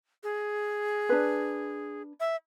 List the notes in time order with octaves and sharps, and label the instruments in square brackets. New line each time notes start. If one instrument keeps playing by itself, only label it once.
[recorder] G#4
[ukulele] D4 B4
[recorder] E5